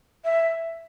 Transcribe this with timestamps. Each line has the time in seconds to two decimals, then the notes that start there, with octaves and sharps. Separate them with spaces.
0.24 E5